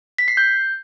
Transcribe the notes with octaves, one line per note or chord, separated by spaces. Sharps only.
B6
C7
G6